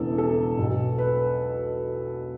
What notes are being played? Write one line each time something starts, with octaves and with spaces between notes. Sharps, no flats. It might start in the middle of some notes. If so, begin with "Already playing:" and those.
Already playing: E1 E2 C#3 E3 A4
A4
B1 B2
B4